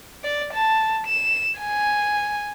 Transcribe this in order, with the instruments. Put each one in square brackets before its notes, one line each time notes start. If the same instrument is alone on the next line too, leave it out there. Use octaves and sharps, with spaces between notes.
[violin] D5
A5
E7
G#5